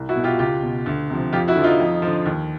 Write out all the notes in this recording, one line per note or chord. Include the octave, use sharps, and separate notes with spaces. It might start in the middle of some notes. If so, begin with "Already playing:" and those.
Already playing: C2
E4 F#4
B2
F4 G4
C#2 F4 G4
B2
D2
C3 F3
F2 F4 G4
E4 F#4
D3 F3
D#4 F4
F2
D3 F3
D#2